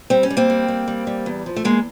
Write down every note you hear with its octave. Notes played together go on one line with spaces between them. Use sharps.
G3 C4
C#4
G3
A#3 C4
G3
G3
G3
G3
E2
F3
A3
E2 G#3 A#3